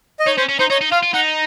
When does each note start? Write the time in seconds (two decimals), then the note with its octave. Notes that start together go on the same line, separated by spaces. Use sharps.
0.19 D#5
0.26 D#4 C#5
0.38 C#4 C5
0.49 C#4
0.59 D#4 C5
0.70 D#4 C#5
0.81 D#4
0.91 F4 F5
1.03 F4
1.14 D#4 F#5